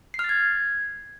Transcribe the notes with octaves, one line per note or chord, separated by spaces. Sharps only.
C7
F6
A6
G#6